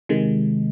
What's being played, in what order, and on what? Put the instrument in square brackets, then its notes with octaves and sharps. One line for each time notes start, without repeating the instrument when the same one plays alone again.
[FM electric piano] C3 D#3 G#3